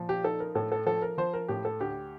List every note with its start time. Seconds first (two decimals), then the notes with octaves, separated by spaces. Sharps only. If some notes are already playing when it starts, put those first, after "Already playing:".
Already playing: A#2 F3
0.09 G4
0.24 D#4 A4
0.40 A#4
0.55 A2 A4
0.72 A4
0.86 F3 A4
1.02 A#4
1.18 F3 C5
1.34 A#4
1.48 A2 G4
1.65 A4
1.80 D2 G4